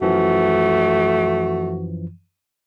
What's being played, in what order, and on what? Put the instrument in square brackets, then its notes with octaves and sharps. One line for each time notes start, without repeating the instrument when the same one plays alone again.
[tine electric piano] F#2 E3 F3 [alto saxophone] A3 [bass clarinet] F#4